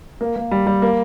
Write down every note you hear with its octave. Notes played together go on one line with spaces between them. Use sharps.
A#3
A#3
G3
G3
A#3